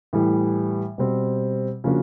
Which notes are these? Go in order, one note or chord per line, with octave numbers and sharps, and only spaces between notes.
A2 E3 G3
B2 G3 C4
C#3 F3 A#3 D4 F#4